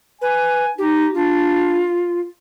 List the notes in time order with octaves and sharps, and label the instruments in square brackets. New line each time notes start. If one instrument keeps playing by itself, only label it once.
[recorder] B4 [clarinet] G#5
[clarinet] D#4 [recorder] G4
[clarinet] D4 [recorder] F4